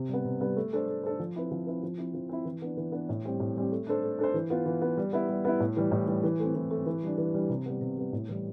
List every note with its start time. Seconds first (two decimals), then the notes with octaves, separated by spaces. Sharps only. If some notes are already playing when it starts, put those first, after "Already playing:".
Already playing: C3
0.09 G3 B3
0.25 C3
0.40 G3 B3
0.56 A3
0.73 D4 A4 C5
0.88 A3
1.03 D4 A4 C5
1.20 F3
1.36 C4 E4 B4
1.52 F3
1.67 C4 E4 B4
1.83 F3
1.98 C4 E4
2.14 F3
2.29 C4 E4
2.45 E3
2.62 B3 D4
2.77 E3
2.92 B3 D4
3.09 A2
3.25 G3 C4 G4
3.40 A2
3.56 G3 C4 G4
3.72 A3
3.87 D4 A4 C5
4.03 A3
4.19 D4 A4 C5
4.34 E3
4.50 B3 F4
4.66 E3
4.82 B3 F4
4.97 G3
5.13 B3 E4
5.29 G3
5.45 B3 E4
5.60 A2
5.77 E3 G3
5.92 A2
6.08 E3 G3
6.23 E3
6.40 A3 C4
6.55 E3
6.71 A3 C4
6.86 E3
7.03 G3 D4
7.18 E3
7.34 G3 D4
7.49 C3
7.66 G3 B3
7.81 C3
7.97 G3 B3
8.13 A2
8.28 E3 G3